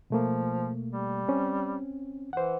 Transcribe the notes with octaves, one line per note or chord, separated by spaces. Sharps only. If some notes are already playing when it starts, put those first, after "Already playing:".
B2 F3 A3 A#3
G3
C4 C#4
E3 C5 F#5